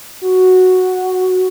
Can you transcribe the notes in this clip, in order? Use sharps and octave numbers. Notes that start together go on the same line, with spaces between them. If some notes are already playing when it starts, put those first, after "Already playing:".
F#4